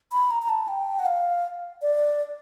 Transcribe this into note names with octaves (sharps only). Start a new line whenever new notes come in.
B5
A#5
A#5
A5
G5
F#5
F5
D5